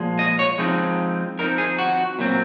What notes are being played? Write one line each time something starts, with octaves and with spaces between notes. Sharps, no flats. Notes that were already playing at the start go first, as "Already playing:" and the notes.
Already playing: A#2 F3 G#3
D#5
C#5
F3 G#3 C4 D#4
F3 C4 D#4 A#4
G#4
F#4
A#2 F#3 C4